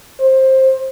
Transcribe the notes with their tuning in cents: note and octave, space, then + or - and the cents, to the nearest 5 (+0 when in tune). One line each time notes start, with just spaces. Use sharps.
C5 +15